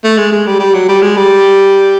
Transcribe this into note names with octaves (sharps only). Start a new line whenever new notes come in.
A3
G#3
G#3
G3
G3
F#3
G3
G#3
G3